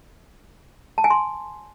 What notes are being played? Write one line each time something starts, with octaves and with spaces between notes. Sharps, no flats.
A5
G#5
C6